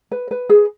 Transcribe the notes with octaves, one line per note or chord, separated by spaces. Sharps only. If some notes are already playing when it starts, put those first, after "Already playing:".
B4
B4
G#4